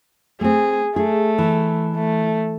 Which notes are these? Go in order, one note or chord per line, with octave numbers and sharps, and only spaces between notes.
A3 C4 G#4
A3 G#4
E3
A3